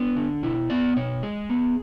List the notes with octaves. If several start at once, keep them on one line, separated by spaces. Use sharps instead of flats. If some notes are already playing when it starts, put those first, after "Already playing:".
Already playing: B3 D4
D3
B2 E4
B3 D5
B2 C#5
G#3 G#4
B3